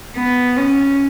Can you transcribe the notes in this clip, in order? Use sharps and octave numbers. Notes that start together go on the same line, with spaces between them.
B3
C#4